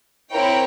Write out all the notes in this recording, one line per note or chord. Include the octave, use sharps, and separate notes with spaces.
C4 E4 A#4 C#5 G5